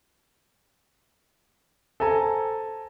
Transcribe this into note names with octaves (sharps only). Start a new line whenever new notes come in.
A4 C5 G#5 A#5